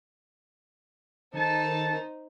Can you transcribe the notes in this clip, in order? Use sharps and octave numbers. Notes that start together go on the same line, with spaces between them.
D#3 D#4 A4 C5 A5